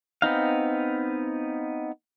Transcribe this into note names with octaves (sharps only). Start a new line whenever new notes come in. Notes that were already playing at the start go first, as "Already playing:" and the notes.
B3 C4 D#4 F5